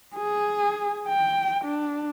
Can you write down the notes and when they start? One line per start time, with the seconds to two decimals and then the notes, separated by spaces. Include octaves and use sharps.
0.15 G#4
1.08 G5
1.64 D4